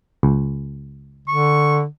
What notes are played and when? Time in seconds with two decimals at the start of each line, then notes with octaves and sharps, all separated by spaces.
0.23 C#2
1.28 D3 C#6